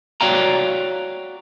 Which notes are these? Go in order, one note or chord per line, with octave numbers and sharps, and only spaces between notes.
F#4 C#5 D5 F5 G5 A#5